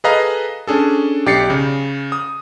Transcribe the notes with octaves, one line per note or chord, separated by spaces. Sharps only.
G#4 A4 B4 D#5 F5 A#5
C#4 D4 G#4 A4
B1 G4 D5 A6 C7 C#7
C#3
D#6